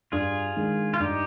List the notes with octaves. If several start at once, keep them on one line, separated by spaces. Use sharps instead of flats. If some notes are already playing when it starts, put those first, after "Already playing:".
G2 F4 G#4
D#3 G#3 D4
F4
G2 D#4 G4